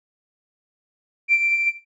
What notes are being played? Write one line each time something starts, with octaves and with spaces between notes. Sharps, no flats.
D7